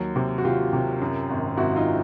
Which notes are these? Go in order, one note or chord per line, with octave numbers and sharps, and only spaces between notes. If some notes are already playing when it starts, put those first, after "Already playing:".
Already playing: D#2 F#3
C3
F#4
C3 F4 G4
C3
F#2
G#1
G#1 E4 F#4
D#4 F4